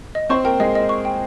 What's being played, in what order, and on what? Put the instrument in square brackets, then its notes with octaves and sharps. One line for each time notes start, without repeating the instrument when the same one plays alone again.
[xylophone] D#5
[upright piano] C4 C5 [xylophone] C#6
[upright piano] A#3 A#4 [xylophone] G5
[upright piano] G#3 G#4 [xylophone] D#5
[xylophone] D#5
C#6
G5